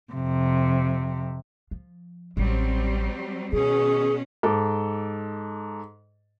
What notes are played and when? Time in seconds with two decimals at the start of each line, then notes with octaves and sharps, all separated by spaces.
0.13 F2 C3
1.71 F3
2.37 A1 F#3 G3 C4
3.53 B2 D#3 C#4 G#4
4.43 G#2 A4 D6